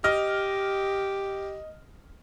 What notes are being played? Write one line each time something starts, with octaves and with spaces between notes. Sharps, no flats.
G4 D#5 F6